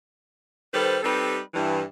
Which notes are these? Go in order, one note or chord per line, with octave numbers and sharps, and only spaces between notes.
D#3 G3 A4 B4 C5
G3 C4 D#4 G4 A4 B4
G2 E3